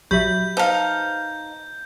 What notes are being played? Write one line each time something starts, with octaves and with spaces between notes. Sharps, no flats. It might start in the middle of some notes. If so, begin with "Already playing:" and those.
A#1 F#3 G4 E5 B5 G6
D#4 B4 C5 F5 A5